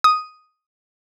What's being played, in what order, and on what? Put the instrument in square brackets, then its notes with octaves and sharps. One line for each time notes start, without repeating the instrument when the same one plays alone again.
[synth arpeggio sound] D#6